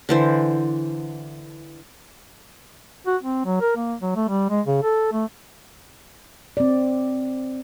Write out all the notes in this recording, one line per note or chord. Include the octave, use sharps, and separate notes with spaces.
D3 E3 C5
F#4
C4
F#3
A#4
A#3
F#3
A3
G3
G#3
C#3
A4
A3
C4 D5